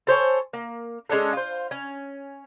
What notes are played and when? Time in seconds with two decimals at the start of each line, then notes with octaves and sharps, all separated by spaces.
0.07 A4 C5 C#5 G#5
0.53 A#3
1.09 G#3 C#4 D4 A4
1.33 F4 C5
1.71 C#4